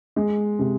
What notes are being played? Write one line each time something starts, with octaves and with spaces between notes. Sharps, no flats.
G#3
C3